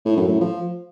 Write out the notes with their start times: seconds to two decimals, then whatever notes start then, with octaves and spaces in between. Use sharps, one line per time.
0.05 A2
0.17 F#2
0.29 A2
0.40 F3